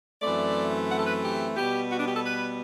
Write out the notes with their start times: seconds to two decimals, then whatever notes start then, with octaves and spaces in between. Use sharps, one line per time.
0.22 F#2 E3 A3 C4 D5
0.90 F#5
0.97 A4
1.06 B4
1.22 G4
1.56 B2 G3 B3 G4
1.90 F#4
1.98 D4
2.06 G4
2.15 A4
2.23 B4